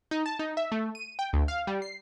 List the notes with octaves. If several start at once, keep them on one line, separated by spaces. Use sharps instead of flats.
D#4
A5
D#4
E5
A3
D#7
G5
D2
F5
G3
C7